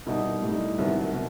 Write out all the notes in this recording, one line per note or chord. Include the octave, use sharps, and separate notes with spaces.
C2 B2 G3 D#4
A2 G3 D#4
C2 C3 D#3 F#3 B3
B2